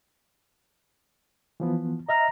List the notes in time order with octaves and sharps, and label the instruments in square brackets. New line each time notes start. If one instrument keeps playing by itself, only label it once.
[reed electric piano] E3 F3 B3
[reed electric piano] D#5 E5 F6 [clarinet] A#5